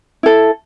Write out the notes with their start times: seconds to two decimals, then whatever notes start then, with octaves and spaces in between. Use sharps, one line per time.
0.23 E4 A4